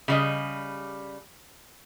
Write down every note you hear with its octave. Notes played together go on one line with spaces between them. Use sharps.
C#3 G3 D#5